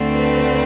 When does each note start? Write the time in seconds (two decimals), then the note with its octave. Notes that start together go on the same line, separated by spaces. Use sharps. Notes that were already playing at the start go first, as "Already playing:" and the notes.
Already playing: D2 D3 A3 C4
0.12 B4